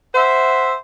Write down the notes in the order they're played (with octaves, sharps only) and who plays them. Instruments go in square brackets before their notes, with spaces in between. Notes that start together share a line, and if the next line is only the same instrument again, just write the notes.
[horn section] C5 E5 F#5